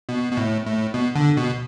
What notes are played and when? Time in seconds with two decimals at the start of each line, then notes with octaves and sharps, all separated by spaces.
0.09 B2
0.32 B2
0.37 A2
0.66 A2
0.94 B2
1.15 D3
1.37 B2